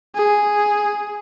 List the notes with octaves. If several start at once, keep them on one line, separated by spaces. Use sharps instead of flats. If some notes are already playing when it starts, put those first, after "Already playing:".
G#4